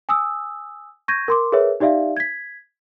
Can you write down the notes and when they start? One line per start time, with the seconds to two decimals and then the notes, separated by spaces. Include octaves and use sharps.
0.09 G#5 D#6 E6
1.08 C#6 G6 G#6 A#6 D#7
1.28 A#4 C6 D6
1.52 G#4 A#4 B4 C#5 E5
1.80 D#4 G4 D5 E5 F5
2.17 G#6 B6